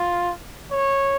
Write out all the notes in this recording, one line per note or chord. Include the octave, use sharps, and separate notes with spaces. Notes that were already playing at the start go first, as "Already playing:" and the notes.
Already playing: F4
C#5